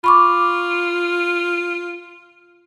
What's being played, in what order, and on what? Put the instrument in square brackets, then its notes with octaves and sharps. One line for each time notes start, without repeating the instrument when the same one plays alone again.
[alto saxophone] F4 [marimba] B5 C#6 D6